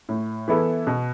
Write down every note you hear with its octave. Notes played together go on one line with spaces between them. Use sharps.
A2
E3 B3 E4 A4
B2